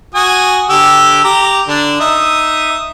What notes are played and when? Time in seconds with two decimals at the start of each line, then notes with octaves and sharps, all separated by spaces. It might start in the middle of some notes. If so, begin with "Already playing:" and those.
0.14 F#4 G#5 D#6
0.69 D3 G4 E6
1.24 G4 A#5 D6
1.68 D3 D4
2.00 D#4 E5 D#6